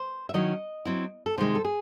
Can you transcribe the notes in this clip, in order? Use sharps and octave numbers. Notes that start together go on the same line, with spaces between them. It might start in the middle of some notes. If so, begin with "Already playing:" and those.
Already playing: C5
E5
D#3 F#3 C#4 E4 D#5
F#3 C4 E4
A4
C3 D#3 G#3 D#4 C5
A4
G#4